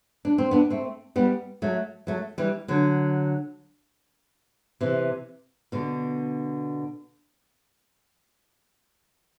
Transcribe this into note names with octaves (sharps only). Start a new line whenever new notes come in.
D4
C4
B3 D4
A3 C4
G3 B3
F#3 A3
F#3 A3
E3 G3
D3 F#3
C3 E3
B2 D3